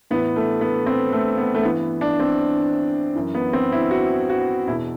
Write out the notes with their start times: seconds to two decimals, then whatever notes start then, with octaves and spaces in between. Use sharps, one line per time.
0.11 A2 E3 B3
0.36 A3
0.61 B3
0.86 C4
1.13 A3
1.38 B3
1.55 A3
1.63 G2 E3 B3
2.01 D4
2.20 C4
3.15 F#2 E3
3.35 B3
3.53 C4
3.72 E4
3.91 F#4
4.30 F#4
4.67 E2 B2 E4